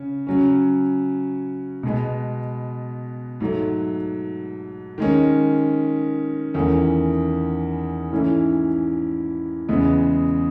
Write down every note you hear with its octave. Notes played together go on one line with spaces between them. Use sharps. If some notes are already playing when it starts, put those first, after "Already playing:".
Already playing: C#3 C#4
C#3 F#3 C#4
B2 G#3 B3
G#2 F#3 A3
D#3 G#3 C#4
E2 D#3 A3 C#4 E4
G#2 E3 A3 C#4 E4
E2 C#3 G#3 B3